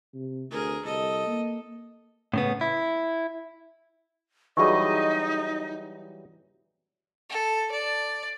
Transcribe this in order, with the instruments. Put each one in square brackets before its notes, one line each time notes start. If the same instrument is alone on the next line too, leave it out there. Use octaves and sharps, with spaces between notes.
[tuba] C3
[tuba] D2 [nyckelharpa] G#4 A#4
[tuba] C2 [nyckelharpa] A4 D#5
[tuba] A#3
[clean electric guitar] A2 C#3 B3
E4
[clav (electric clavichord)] E3 F#3 G3 [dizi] D#4 [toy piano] F#4 G#4 C#6 [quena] D#5
[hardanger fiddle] A4
D5